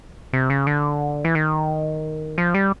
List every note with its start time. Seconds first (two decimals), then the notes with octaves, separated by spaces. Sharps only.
0.33 C3
0.50 C#3
0.67 D3
1.25 E3
1.35 D#3
2.38 F3
2.54 G3